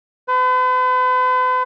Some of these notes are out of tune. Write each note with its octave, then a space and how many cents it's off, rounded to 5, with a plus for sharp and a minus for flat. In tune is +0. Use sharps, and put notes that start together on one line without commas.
B4 +45